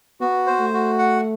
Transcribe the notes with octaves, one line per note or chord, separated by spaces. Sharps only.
B3 F#4
C5
A3
F#4
F#5